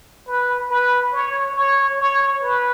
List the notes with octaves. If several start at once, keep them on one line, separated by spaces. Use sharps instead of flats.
B4
B4
C#5
C#5
C#5
B4